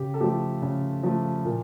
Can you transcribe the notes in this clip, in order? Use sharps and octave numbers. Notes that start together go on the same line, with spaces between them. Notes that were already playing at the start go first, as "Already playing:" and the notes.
Already playing: C#3 G4
A4
F3 A3 G4
C#3
F3 A3
A#2